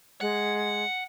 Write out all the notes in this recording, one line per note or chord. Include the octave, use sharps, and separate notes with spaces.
G#3 F#5